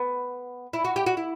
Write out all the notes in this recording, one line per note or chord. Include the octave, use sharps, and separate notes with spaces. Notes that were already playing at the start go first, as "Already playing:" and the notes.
Already playing: B3
E4
F#4
G4
F#4
E4